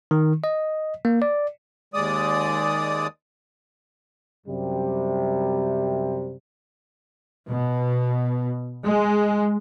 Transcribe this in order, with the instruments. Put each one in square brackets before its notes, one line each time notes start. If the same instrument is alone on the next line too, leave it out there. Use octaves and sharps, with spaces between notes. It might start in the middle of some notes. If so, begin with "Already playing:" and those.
[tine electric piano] D#3
D#5
A#3
D5
[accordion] D#2 G#3 D5 D#6
[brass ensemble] F#2 C3 G3
[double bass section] B2
G#3